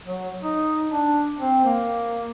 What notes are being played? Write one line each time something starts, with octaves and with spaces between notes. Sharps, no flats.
F#3
D#4
D4
C4
A#3